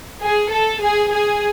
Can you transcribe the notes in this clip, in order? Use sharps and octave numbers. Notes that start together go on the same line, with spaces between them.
G#4
A4
G#4
G#4